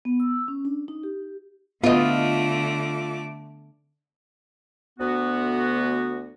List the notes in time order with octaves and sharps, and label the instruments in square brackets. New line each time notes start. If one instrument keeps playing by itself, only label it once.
[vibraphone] B3
E6
C#4
D4
D#4
G4
[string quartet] D3 A3 D6 [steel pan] B3 [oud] F4 D#5
[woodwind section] D2 B3 F#4